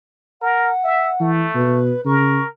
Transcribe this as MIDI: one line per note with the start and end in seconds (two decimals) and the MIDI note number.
0.42 0.71 70
0.42 1.28 78
0.83 1.12 76
1.21 1.46 52
1.21 1.81 57
1.55 1.93 47
1.55 2.01 71
2.06 2.41 49
2.06 2.48 70
2.06 2.43 85